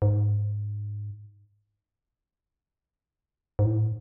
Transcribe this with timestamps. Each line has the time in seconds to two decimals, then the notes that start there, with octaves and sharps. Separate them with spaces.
0.02 G#2
3.59 G#2
3.65 A2